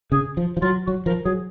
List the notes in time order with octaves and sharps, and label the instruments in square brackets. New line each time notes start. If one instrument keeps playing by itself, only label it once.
[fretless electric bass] C#3 [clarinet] G#4
[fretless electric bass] F3
F3
[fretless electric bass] F#3 [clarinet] F4
[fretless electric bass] F#3 [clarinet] F#4
[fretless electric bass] F3 [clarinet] A#4
[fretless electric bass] F#3 [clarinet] G#4